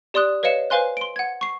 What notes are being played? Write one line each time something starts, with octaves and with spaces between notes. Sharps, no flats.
G4 D5 C6 D#6 F#6
B4 C#5 D#5 F5 C#7 E7
B4 C5 F5 G#5 C6 F#6
C6 D7
F#5 G#6
C#6 C7